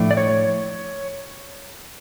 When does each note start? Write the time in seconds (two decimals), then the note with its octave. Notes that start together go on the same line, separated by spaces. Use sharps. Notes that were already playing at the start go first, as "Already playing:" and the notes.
Already playing: A2 F3 A3 D4
0.11 D5
0.17 C#5